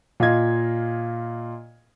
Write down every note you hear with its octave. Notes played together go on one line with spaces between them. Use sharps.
A#2 F4 D#5 G#6